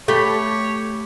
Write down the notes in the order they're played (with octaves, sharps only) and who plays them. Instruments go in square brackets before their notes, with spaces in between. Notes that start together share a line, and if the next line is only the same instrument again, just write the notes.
[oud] A3 [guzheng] G4 B5 [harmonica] C#5